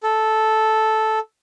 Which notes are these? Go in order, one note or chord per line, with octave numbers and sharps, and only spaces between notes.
A4